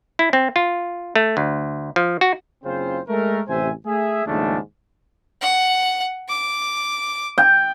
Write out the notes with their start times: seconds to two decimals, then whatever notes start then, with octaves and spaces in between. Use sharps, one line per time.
0.19 E4
0.33 C4
0.56 F4
1.15 A3
1.37 D2
1.96 F3
2.21 F#4
2.64 F#1 C#3 C4 F4 C5
3.08 G#3 A3 A#4
3.48 A1 C3 C5 E5 G#5
3.85 A3 G#4 E5
4.26 D#2 G#2 C#3 F3 A3 D4
5.41 F#5
6.28 D6
7.38 G5